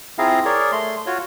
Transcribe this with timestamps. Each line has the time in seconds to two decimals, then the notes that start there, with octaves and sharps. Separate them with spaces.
0.19 C4 E4 F4 G#4 F5 A#5
0.45 G#4 A#4 C#5 D5
0.72 A3 C6
1.06 F4 F#4 C#5